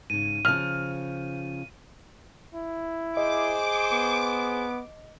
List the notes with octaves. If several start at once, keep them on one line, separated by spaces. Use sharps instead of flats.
G#2 C#3 D#7
C#3 F3 F6
E4
G#4 C5 D#5 D6
B3